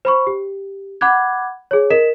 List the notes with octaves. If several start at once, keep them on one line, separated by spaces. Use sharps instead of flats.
C5 B5 C#6
G4
F#5 B5 D6 F#6 G#6
G#4 C#5
A#4 D#5 B6 E7